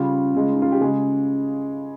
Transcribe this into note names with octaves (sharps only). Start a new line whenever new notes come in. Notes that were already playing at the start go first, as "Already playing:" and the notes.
Already playing: C#3 G3 F4
C#3 G#3
D#4
F4
G4
C#3 G#3 G#4